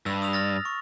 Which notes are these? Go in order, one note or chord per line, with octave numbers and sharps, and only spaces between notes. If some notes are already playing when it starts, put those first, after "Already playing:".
G2 E6
D#6 E6 F7
F6 A6 A#6
C#6